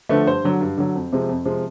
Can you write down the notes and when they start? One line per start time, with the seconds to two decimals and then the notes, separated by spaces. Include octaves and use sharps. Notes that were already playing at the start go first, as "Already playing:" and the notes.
0.09 D3 F3 A3 B4
0.26 G2 C5
0.44 D3 F#3
0.61 G2
0.77 D3 F#3
0.96 F2
1.13 C3 F3 G#3
1.29 F2
1.45 C3 F3 G#3